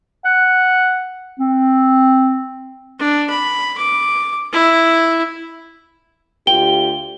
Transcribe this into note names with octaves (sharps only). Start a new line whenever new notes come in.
F#5
C4
D4
B5
D6
E4
D2 F4 G4 G5 G7